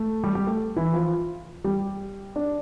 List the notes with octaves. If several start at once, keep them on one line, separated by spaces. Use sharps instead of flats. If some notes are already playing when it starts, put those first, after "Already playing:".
Already playing: A3
G3 G4
G3 G4
A3 A4
E3 E4
F3 F4
G3 G4
D4 D5